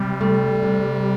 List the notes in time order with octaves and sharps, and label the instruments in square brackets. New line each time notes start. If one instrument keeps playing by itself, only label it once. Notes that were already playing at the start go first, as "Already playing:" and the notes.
Already playing: [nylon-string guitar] C3 [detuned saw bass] G3
[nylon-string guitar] A3
C3